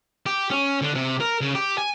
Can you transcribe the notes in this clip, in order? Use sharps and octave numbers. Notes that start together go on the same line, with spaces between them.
G4
C#4
D3
C3
A#4
C#3
G4
G#5